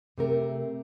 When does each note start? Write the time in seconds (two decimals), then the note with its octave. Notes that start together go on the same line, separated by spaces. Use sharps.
0.18 C3 A3 A#4